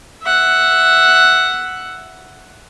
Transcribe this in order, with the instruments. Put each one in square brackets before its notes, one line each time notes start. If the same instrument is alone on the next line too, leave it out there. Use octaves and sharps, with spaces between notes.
[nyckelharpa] E5 F#5